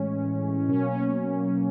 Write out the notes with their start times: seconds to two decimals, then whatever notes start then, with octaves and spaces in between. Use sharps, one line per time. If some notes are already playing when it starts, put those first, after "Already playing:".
Already playing: A2 E3 G#3 C#4
0.68 B2 F#3 A#3 C#4
0.90 C#4